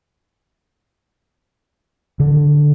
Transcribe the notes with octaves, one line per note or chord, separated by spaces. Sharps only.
D3